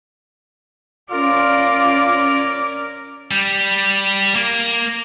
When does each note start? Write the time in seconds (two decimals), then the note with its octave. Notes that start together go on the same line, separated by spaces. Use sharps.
1.12 C#4 F4 A#4 D5 D6
3.31 G3
4.35 A#3